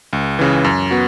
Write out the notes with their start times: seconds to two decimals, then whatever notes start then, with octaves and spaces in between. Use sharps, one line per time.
0.13 C#2
0.39 C#3 E3
0.64 F#2
0.91 B3 F#4